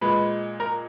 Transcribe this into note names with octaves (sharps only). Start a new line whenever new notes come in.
A#2 G#3 B4 B5
A#4 A#5